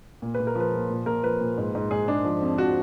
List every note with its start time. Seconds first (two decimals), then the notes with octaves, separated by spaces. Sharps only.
0.22 A#2
0.34 B4
0.40 A#2
0.47 A#4
0.55 F3 B4
0.73 A#2
0.90 A#2
1.06 A#2 A#4
1.23 F3 B4
1.41 A#2
1.58 G#2
1.75 G#2
1.91 G#2 G#4
2.08 G#2 D4
2.25 F3
2.42 F2
2.58 F3 F#4